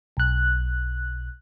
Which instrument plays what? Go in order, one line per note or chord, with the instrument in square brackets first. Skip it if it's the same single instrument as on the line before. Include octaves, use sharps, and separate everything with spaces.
[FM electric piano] B1 F#6